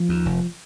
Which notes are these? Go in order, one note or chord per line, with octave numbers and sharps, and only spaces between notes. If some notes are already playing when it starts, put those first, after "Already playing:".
Already playing: F3
D#2
F1